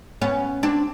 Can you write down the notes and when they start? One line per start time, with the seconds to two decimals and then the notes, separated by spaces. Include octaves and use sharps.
0.22 B3 C#4
0.63 C4 D4